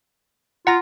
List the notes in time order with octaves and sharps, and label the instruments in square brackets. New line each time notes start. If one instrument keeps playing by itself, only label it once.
[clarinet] F4 [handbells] F#5 A#5 A#6